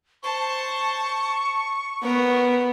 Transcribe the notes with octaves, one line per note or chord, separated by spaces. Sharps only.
C5 A5 C#6
B3 A#4